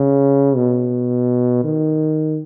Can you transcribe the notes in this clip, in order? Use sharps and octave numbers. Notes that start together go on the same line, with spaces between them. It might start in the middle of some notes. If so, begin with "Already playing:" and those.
Already playing: C#3
B2
D#3